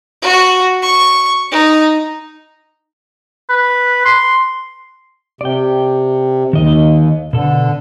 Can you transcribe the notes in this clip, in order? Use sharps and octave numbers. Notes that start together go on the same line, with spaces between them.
F#4
C#6
D#4
B4
C6
C3 D5 G5
D#2 D#3 D#5
B2 D3 A4